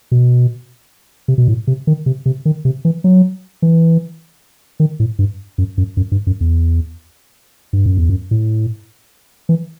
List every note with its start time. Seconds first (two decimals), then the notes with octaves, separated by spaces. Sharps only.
0.12 B2
1.28 C3
1.38 B2
1.48 A2
1.67 C3
1.87 D#3
2.06 C3
2.26 C3
2.45 D#3
2.65 C3
2.85 E3
3.04 F#3
3.62 E3
4.80 D#3
5.00 A2
5.19 G2
5.58 F#2
5.78 F#2
5.97 F#2
6.12 G2
6.27 F#2
6.41 E2
7.73 G2
7.86 F#2
7.98 E2
8.09 F#2
8.31 A2
9.49 E3